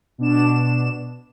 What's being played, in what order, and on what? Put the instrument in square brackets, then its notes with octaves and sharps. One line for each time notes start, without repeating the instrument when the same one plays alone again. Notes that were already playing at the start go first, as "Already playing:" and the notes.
[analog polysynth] B2 D4 E7